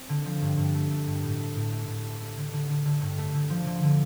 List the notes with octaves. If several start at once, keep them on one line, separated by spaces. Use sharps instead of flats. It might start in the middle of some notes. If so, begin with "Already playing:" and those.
Already playing: C4
D3
F3
G2
G2
A3
A3
G2
A2
A3
A2
A3
A2
A3
A3
D3
D3
D3
D3
G2
A3
D3
F3
D3
D3